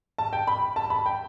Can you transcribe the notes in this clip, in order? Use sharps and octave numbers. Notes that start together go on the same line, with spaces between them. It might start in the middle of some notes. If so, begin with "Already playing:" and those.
A5
G5
B5
A5
B5
G5